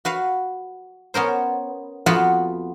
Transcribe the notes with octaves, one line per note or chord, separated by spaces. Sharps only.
F#4 B4 F5
B3 C#4 A#4 C5
F2 B3 F4 F#4 B4 B5